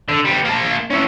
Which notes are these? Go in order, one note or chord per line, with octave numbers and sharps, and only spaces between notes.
D3
G3 B3
A#3 A5
C#4 E4